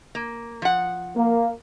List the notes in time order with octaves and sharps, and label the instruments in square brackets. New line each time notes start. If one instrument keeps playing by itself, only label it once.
[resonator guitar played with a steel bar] A#3
F3 F#5
[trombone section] A#3